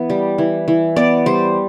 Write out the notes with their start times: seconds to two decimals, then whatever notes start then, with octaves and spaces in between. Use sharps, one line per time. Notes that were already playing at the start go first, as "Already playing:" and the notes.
Already playing: E3 B3
0.10 G3
0.38 E3
0.68 E3
0.96 B3 D5
1.26 G3 C5